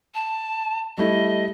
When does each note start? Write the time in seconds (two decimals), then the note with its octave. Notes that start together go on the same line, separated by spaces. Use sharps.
0.14 A5
0.98 G3 A3 E4 D#5